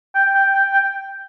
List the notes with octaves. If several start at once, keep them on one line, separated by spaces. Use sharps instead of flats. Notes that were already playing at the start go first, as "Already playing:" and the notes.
G5
G5
G5
G5